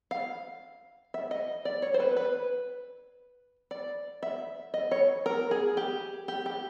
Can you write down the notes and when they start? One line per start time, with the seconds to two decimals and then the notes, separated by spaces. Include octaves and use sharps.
0.11 F5
1.14 E5
1.31 D#5
1.65 D5
1.82 C#5
1.94 C5
2.00 B4
2.17 B4
3.71 D5
4.23 E5
4.74 D#5
4.91 C#5
5.26 A#4
5.51 G#4
5.77 G4
6.28 G4
6.46 G4